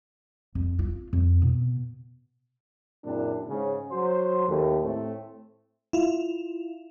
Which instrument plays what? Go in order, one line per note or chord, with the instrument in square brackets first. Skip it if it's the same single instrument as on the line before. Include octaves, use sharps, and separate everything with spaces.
[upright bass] F2
F4
F2
B2
[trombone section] F#2 A#2 C#3 C4 D4 E4
G#2 C#3
F#3 C5
D#2 A3
A2 A3 C4
[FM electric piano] E4 F4